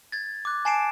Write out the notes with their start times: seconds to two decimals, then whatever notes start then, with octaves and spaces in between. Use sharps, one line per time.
0.12 G#6 A6
0.45 D6 F#6
0.65 G#5 A5 C7 D7 E7